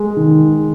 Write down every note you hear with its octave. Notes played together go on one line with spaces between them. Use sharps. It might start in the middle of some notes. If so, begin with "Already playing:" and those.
Already playing: G#3
D#3